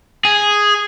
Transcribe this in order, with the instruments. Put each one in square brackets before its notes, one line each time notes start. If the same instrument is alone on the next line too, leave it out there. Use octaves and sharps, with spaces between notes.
[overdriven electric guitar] G#4